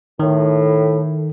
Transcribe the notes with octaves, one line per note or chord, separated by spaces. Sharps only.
A2 D#3